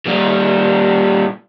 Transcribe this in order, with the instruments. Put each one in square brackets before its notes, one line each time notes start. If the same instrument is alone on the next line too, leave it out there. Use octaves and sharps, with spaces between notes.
[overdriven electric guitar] A#2 G3